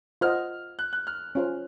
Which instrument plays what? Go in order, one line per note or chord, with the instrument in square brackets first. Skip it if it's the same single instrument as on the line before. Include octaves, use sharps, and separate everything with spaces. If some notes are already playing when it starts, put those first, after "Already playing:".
[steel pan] F4 C5 D#5 F#5 [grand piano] F6
[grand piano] F#6
F#6
F6
[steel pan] C#4 F4 C5